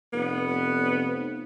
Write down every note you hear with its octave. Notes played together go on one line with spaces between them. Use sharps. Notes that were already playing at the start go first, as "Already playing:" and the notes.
F1 B3